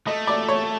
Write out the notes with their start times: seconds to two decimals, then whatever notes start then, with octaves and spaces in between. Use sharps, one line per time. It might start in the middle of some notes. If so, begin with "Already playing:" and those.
0.07 A3 D#5
0.27 D5
0.48 C#5